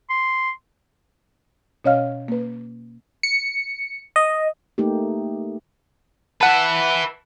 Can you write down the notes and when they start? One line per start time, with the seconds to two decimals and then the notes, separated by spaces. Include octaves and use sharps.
0.10 C6
1.84 B2 C#4 C#5 D#5 F5 F6
2.28 A#3 B4
3.23 C#7
4.16 D#5
4.78 A3 A#3 D#4 G4
6.41 B4 E5 F#5 A5